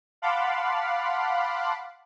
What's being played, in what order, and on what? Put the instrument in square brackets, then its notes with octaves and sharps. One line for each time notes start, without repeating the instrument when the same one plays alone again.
[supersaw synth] F5 F#5 A5 B5 C6 D6